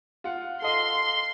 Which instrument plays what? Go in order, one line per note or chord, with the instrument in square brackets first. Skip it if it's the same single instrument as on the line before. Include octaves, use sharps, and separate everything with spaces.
[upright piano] F4 F#5
[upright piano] A4 D#5 F5 [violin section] C6